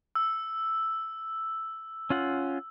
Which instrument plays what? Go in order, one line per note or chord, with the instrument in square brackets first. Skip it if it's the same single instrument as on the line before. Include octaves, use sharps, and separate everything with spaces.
[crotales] E6
[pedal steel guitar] C#4 F4 F#5